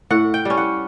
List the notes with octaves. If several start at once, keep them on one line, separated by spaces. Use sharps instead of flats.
A2 F#5
G5
G3 C#4
F#5